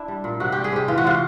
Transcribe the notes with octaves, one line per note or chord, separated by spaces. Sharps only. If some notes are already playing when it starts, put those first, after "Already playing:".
Already playing: D4 E4
G3
A#2
C3 F#4
G3 G4
G#4
C3 G4
E3 F4
F#4
C3 F4